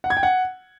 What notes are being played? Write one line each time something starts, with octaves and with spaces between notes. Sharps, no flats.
F#5
G#6
G5
F#5